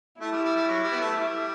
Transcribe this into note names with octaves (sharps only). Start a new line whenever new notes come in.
A3 E4
G3
G3
G3
F#3
G3
B3
A3
G3